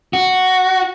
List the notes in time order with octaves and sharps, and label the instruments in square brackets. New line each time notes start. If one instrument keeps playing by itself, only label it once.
[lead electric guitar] F#4